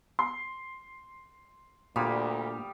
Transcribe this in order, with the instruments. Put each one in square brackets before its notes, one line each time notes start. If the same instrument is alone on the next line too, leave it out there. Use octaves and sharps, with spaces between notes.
[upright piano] C6
[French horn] D2 [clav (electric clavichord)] A#2 [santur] G3 F5 D#6